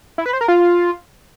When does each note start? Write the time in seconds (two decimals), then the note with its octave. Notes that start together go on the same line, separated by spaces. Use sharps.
0.18 E4
0.26 B4
0.33 C5
0.41 A#4
0.48 F4